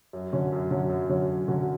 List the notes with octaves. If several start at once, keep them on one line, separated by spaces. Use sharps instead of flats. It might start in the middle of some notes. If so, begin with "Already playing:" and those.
F#2
D3 F#3 C#4
F#2
D3 F#3 C#4
F#2
D3 F#3 C#4
F#2
D3 F#3 C#4